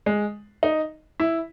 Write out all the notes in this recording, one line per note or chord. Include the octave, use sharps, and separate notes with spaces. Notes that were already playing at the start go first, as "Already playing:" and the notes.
G#3
D#4
E4